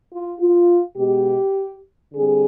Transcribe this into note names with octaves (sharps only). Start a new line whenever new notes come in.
F4
F4
B2 G#3 B3 G4
D3 G3 C4 G#4